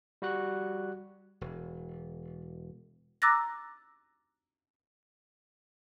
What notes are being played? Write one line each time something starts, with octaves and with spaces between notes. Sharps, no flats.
G3 F#4 F#6
E1
A#5 D6 E6 F#6 A6 A#6